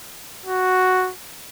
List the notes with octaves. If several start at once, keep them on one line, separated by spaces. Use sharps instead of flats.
F#4